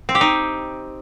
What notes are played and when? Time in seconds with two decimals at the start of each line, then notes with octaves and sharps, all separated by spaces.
0.09 C4
0.15 G4
0.21 D#4